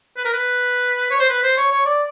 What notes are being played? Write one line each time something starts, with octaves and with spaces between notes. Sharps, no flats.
B4
A#4
B4
C#5
C5
B4
C5
C#5
C#5
D5